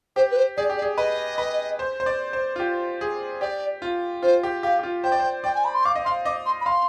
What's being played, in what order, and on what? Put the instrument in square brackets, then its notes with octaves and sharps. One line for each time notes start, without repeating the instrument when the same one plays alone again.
[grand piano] G4 [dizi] C5
[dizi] B4
C5
[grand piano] G#4 [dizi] D5
[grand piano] G4
[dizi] D5
[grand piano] G#4
[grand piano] B4 [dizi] D#5
[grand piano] B4
C5
C5
D5
C5
F4
G4
G#4
[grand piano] G4 [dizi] D5
[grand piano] F4
[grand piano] F4 [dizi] C5
[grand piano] G4
[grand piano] G4 [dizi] F5
[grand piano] G4
F4
[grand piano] C5 [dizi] G5
[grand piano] D5
C5
[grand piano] D5 [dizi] G5
[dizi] G#5
B5
C6
[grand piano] F5 [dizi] D6
[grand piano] D#5
[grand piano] F5 [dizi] C6
[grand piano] D#5 [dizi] D6
[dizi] C6
B5
[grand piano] F5 [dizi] C6